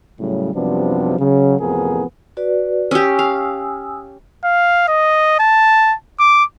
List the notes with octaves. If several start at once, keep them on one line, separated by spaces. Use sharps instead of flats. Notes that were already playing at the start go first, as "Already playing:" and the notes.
A2 C#3 F#3 G3
F#2 C3 F3 G3 B3 D4
C#3 F#3
A1 F2 C3 B3 G#4 A#4
F#4 B4 D5
C#4 G4 G#5 D#6 E6
F5
F5
D#5
A5
D6